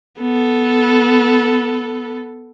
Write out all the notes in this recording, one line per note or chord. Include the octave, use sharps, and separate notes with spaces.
B3 A4